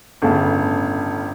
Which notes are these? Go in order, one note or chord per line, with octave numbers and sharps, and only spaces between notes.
G1 A2 C#3 A5